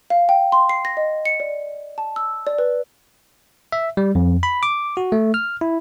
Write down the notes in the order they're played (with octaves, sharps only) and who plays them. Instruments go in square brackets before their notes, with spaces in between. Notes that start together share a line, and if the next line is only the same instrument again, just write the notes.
[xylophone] F5
G5
C6
C7
A#6
D#5
C#7
D5
A5
E6
D5
B4
[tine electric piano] E5
G3
F2
B5
D6
F#4
A3
F6
E4